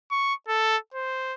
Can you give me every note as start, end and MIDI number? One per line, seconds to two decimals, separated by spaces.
0.11 0.34 85
0.48 0.77 69
0.94 1.35 72